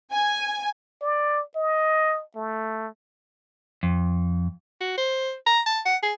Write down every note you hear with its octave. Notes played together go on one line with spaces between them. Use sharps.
G#5
D5
D#5
A3
F2
F#4
C5
A#5
A5
F#5
G#4